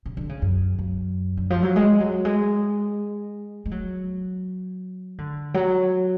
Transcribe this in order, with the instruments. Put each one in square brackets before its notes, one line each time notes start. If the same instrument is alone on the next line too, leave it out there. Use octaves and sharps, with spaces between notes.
[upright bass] C#3
D3
C#3
F#2
F#2
D3
F3
F#3
G#3
F#3
G#3
G#3
F#3
D3
F#3